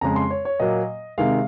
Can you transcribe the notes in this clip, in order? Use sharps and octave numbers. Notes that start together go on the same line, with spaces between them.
F2 C#3 G#3 A#5
C6
C#5
C#5
A#2 F#3 A#3 D#5
C3 D#3 G#3 F5